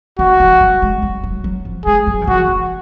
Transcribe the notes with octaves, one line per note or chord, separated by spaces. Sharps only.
D#3 F#4
F3
F#3
G#3
F#3
F#3
F#3
F3
G#3 G#4
F#3
D#3
F3 F#4
F3